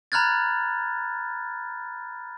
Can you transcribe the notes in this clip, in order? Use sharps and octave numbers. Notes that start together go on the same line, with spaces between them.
A#5 B5 F6 F#6 G#6 A6